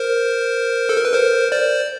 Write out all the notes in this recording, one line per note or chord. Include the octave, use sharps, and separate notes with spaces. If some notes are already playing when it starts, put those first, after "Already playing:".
Already playing: A#4 C5
A4
A#4
B4
A#4 C5
C5 D5